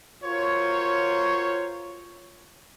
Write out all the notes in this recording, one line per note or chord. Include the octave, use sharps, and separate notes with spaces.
F4 F#4 A#4 C5 C#5